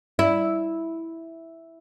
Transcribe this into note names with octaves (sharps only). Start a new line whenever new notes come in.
E4